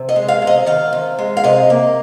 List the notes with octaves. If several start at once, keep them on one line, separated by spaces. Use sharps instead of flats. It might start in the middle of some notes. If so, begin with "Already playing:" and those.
Already playing: C3
D#5
G#3
F5
C3
D#5
D#3 F5
C3
G#3
F5
C3 D#5
A#3